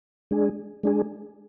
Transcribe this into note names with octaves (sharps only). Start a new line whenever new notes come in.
G#3 D4 G#4
G#3 D4 G#4